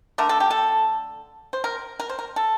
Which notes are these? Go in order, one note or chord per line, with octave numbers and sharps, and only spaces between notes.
D3 A3 A#4
A4
G4
A4
C5
A#4
A#4
C5
A#4
A4